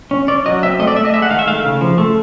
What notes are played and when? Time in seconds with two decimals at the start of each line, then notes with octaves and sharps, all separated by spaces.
0.11 C#4
0.28 C#4 D5
0.46 F#3 D#5
0.63 C4 E5
0.80 A3 D#5
0.87 D5
0.96 A3 E5
1.05 D#5
1.14 G#3 E5
1.22 F#5
1.30 D#3 F5
1.39 E5
1.47 A3 F5
1.65 C#3
1.81 F3
1.98 A3